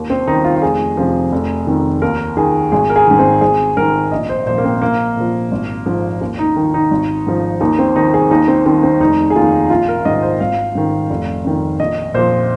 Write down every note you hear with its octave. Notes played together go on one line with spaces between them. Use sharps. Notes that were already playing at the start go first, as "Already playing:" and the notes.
Already playing: D#2
C4
D#3 D#4
F4
F4
F1 G#4
F2 C3 F3
F1
F2 D#3
D#2 A#4
D#3 G#4
G#1 G#4
A#4
G#4
G#2 D#3
C4
G#1 G#4
G#2 D#3 A#4
A#1 D#5
C5
A#2 F3 C5
A#3
C4
A#1 A#3
A#2 F3
G#1
G#2 F3
D#2
D#4
D#3
D#4
G#1
G#2 F3
D#2 D#4
C4
D#3 D#4
G#4
D#2 D#4
C4
D#3 C4
C4
F1 D#4
G#4
D#2 D#3 F4
A#1 F4
A#4
G#2 D#3 D#5
C5
G#1 F5
G#2 D#3
F1
F2 D#3
A#1 D#5
A#2 F3 C5